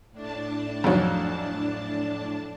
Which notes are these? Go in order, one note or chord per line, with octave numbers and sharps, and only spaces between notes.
A2 D4 A5
F2 G#2 F#3